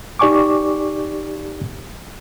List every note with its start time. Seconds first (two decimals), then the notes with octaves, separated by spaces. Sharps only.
0.19 D#4 G4 D5 G#5 C#6 D6